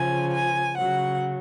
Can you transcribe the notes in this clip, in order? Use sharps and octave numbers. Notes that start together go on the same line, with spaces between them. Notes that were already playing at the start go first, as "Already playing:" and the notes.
Already playing: C#3 F3 G#5
G#5
C#3 F#3 F#5